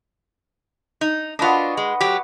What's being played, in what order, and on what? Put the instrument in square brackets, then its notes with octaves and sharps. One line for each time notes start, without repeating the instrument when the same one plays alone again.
[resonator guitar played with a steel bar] D#4
[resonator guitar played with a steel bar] D4 F4 [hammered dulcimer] F#4 B4 D#5
[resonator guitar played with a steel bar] G#3
F#3 G4